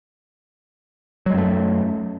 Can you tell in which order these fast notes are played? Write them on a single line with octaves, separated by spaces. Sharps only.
F#3 G#3 F#2 A3